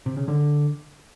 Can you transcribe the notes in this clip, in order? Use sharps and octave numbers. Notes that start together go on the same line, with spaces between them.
C3
C#3
D3